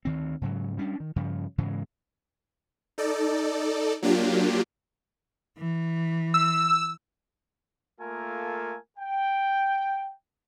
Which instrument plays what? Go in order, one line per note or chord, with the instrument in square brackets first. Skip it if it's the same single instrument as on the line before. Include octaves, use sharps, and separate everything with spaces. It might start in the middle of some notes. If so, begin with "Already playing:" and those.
[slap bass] D2 D#3 C4
G#2 C#3 F#3
G3 C#4 D4
D#3
G2 C#3 F3
G#2 C#3 E3 G#3
[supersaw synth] D#4 A4 D5
F#3 A#3 D4 F4 G4
[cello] E3
[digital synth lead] E6
[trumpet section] A3 A#3 F4 A4 A#4 G#5
G5